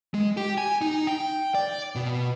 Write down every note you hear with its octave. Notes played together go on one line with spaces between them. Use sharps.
G#3
G4
G#5
D#4
G5
D5
B2